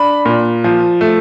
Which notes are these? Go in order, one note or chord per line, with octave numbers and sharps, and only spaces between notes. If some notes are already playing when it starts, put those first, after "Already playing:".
Already playing: D4 B5
A#2
F3
A3